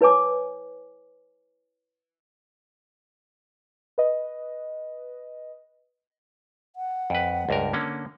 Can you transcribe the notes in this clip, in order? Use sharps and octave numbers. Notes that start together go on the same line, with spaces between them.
E4 B4 C#5 G#5 D6
B4 D#5
F#5
F2 B4
C#2 G2 A#4
D3 A#3 C#4